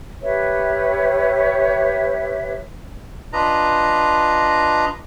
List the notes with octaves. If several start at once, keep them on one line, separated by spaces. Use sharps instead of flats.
G4 B4 C#5 E5
D4 F4 B4 D#5 A#5